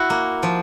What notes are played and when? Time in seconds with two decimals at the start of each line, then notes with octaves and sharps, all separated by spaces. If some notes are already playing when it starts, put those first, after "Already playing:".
Already playing: E4 F#4
0.10 A#3
0.43 F3